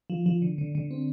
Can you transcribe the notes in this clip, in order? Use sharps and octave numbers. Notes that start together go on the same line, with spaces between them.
F3
F3
D3
D3
D3
C4